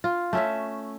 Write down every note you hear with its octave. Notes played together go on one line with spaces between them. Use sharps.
F4
A3 C#4 E5